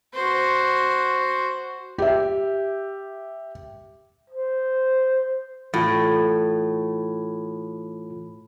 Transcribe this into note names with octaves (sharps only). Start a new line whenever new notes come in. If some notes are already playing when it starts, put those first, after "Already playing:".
F#4 C5
G4 E5
C5
A2 E3 F4